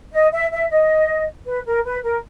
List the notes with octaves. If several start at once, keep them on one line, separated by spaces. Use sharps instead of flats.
D#5
E5
E5
D#5
B4
A#4
B4
A#4